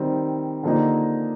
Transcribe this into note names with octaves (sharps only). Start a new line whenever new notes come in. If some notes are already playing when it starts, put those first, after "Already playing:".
Already playing: D#3 G3 C4
D3 F3 A#3 D#4 G4